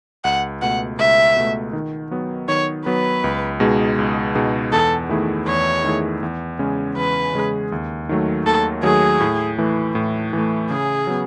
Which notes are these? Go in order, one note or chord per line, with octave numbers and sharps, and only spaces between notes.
C#2 F#5
B2 A3 F#5
C#2 E5
B2 A3
D#3
F#3 B3
D#3 C#5
F#3 B3 B4
C#2
B2 G#3 D#4 G#4
C#2
B2 G#3 D#4 G#4
E2 A4
D#3 A3 E4 G#4
E2 C#5
D#3 A3 E4 G#4
E2
C#3 G#3 C#4 G#4
E2 B4
C#3 G#3 C#4 G#4
D#2
D#3 F#3 A3
D#2 A4
D#3 F#3 A3 G#4
A2
E3 A3
A2
E3 A3
C#3 G#4
F#3 B3